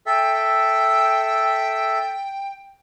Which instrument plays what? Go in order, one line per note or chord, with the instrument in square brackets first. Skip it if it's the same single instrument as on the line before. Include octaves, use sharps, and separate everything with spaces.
[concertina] A4 E5 [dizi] G5